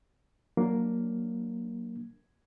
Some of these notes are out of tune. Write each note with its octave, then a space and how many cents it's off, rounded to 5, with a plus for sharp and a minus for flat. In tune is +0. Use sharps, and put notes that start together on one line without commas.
F#3 +0 A#3 +0 D4 +0